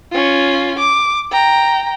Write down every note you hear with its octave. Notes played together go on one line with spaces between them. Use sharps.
C#4 F4
D6
G5 A#5